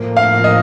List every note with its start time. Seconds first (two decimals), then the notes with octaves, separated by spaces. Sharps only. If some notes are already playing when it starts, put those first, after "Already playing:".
Already playing: A2 F3 A#3
0.17 F5
0.44 D#5